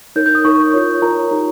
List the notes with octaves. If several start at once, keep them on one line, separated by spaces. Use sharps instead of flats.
D#4 A#4 C#5 G6
G6
D#6
D#4 A#4 C#5 C#6
F4 A#4 C#5
F4 A#4 C#5 A#5
D#4 G4 C#5